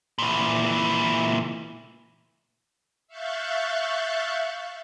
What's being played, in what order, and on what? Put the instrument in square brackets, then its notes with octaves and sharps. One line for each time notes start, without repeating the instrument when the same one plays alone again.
[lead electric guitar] A#2 E3
[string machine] E5 F5 C#6 F#6 G6 A6